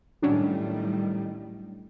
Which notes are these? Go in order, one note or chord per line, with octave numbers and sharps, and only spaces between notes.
A2 D#3 F#3 G3 C#4 D4